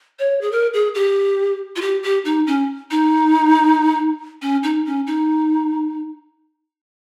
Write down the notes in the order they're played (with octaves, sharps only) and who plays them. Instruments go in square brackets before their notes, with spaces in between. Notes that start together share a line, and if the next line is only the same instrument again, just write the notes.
[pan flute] C#5
G#4
A#4
G#4
G4
F4
G4
G4
D#4
C#4
D#4
C#4
D#4
C#4
D#4